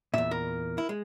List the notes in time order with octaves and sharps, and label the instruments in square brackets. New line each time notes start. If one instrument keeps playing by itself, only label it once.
[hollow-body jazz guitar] E2 A#2 [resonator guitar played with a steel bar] E5
[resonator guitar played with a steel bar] A#4
[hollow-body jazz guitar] E4
G#3